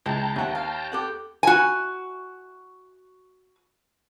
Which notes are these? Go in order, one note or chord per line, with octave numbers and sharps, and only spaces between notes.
C#2 E4 G5 A5 A#5
D#2 E5 F#5
F5
G4 A4 F#5
F#4 G#5